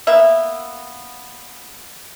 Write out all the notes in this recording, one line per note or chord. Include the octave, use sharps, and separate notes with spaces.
A#3 B3 E5